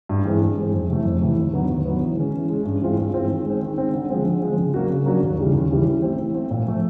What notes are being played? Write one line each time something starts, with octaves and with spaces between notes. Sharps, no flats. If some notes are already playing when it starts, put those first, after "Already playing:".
G2
E3 G#3 C4
G2
E3 G#3 C4
F2
C3 E3 A3
F2
C3 E3 A3
D#2
D3 F#3 B3
D#2
D3 F#3 B3
E3
G#3 C#4
E3
G#3 C#4
G2
E3 G#3 C4 F4
G2
E3 G#3 C4 F4
D#3
G#3 C4
D#3
G#3 C4
D3
F3 G#3 C4
D3
F3 G#3 C4
C#3
F#3 A#3 D4 F#4
C#3
F#3 A#3 D4 F#4
D#2
C#3 E3 G3
D#2
C#3 E3 G3
E3
A3 C4
E3
A3 C4
A#2
F3 A3